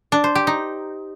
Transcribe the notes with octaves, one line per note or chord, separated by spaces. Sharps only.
D4
C5
G4
D#4